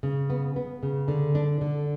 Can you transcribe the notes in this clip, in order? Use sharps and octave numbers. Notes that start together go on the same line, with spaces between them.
C#3
B3
B3
C#3
D3
D4
D3